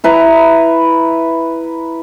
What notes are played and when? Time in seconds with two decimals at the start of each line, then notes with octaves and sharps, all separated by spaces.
0.04 E4 B4 A#5